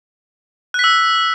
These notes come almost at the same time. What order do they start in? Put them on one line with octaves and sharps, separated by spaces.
F#6 B6 E6